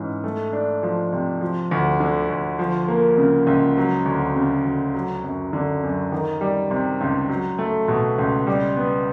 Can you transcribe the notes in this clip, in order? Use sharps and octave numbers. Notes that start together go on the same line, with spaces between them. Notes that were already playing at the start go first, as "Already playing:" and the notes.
Already playing: G#2 E3 C#4
A3
D4
F3
C3
F3
D2
D3
D2
F3
A#3
C#3
C#2
F#3
D2
C#3
D2
F#3
F#2
D3
F#2
D#3
G3
C3
C#2
F#3
A3
B2
C#2
G3
B3